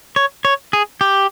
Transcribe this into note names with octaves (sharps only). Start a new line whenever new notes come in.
C#5
C#5
G#4
G4